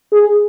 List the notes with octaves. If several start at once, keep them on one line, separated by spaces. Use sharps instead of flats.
G#4